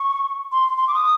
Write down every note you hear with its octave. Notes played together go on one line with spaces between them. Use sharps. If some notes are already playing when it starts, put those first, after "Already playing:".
Already playing: C#6
C6
C6
D6
D#6